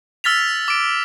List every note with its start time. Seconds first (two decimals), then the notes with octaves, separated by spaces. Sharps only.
0.24 E6 F6 A6 B6 F7
0.68 D6 D7